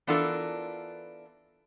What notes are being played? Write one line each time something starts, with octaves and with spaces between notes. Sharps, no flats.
E3 B3 D4 F4 A4 A#4